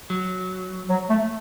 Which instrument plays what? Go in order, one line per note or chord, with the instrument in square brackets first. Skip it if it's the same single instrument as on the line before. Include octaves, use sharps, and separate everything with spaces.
[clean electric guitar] F#3
[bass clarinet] F#3
A3